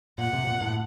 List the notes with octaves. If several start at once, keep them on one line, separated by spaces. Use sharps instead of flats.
A#2 F#5
C3
A#2
A2